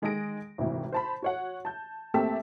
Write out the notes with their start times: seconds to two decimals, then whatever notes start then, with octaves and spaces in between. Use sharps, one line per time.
0.02 D#3 G#3 D#4 G#4 A#6 D7
0.58 G#1 D2 C3 E3
0.92 C5 A5 B5
1.22 F#4 C#5 F#5
1.65 A5 G6
2.14 A3 A#3 C4 G4 E5 A5